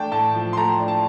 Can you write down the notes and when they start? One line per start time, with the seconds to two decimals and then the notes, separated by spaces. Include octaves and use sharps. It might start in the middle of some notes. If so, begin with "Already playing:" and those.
Already playing: A3 D4 G5 A5
0.11 A2 A5
0.35 F3
0.53 C6
0.57 A3 A#5
0.80 D4
0.88 A5